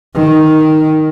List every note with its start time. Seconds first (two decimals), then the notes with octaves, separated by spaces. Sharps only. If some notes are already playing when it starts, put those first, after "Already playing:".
0.15 D#3